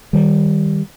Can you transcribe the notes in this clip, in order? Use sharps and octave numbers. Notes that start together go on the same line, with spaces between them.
D#3 G3